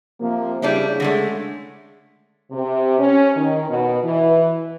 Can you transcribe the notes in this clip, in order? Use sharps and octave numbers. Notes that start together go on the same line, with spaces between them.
C3 F3 A#3
C#3 G3 D4 E4
D3 G#3 A3
C3
C#4
D#3
B2
E3